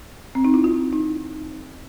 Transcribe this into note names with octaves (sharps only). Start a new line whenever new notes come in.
C4
D#4
E4
F4
D#4